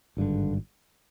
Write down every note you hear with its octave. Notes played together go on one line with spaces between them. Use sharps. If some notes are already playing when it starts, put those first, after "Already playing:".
G#1 G2 D3